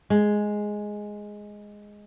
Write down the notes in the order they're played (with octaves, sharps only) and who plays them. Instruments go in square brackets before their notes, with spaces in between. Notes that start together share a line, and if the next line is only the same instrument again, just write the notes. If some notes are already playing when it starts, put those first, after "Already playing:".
[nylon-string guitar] G#3